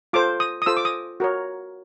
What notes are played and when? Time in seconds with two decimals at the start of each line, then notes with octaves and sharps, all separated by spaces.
0.13 F4 A4 C5 D6
0.40 D#6
0.62 D#6
0.66 F4 A4 C5 E6
0.77 D6
0.85 D#6
1.20 F#4 A#4 C#5